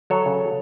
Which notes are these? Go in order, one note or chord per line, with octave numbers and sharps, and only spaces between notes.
F#3 A4 C#5
C#3